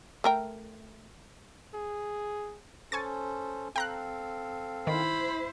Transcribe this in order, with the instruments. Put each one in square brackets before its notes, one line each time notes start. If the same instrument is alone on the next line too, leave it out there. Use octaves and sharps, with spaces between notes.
[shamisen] A3 A#4 G5
[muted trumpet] G#4
[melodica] C#4 A4 C5 [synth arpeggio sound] G#5 C#6 A6
[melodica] C4 A4 F5 [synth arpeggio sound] G5 A#5 F#6
[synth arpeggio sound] D#3 [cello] E4 C5 [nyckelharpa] B5